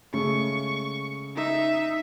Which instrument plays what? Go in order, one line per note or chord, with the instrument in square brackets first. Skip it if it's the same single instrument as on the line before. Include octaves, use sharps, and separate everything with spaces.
[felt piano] C#3 G#3 A3 [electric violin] C#6
[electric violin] D#4 E5